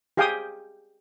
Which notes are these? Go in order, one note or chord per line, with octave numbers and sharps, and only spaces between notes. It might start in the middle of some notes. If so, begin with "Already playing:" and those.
G4 G#4 F5 G5 G#5 D#6